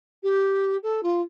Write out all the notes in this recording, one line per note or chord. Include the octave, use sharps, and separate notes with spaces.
G4
A4
F4